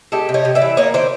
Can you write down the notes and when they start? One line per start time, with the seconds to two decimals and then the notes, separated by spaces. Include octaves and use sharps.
0.12 G#3 G4 A4
0.29 C3
0.34 C#5 D#5
0.45 C3
0.55 D5 E5
0.62 E3
0.77 A#3 C#5 D#5
0.94 D#3 C5 D5